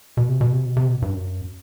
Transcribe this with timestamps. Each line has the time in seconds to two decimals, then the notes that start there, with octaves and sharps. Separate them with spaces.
0.17 B2
0.29 C3
0.41 B2
0.53 C3
0.65 B2
0.77 C3
0.88 B2
1.02 G2
1.13 F#2